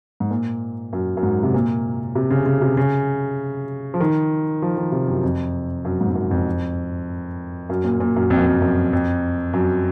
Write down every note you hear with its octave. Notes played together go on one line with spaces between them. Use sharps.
G#2
A#2
F#2
F#2
G#2
C3
A#2
C3
C#3
C#3
C3
C#3
F3
D#3
F3
D#3
C3
F#2
F2
F#2
G#2
G#2
F#2
F2
F#2
A#2
A#2
F#2
F2
F#2
F2
F#2
F2
F#2